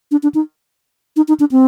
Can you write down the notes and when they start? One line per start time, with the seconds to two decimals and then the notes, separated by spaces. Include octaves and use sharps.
0.11 D4
0.23 D4
0.35 D#4
1.16 D#4
1.28 D#4
1.40 D4
1.52 C4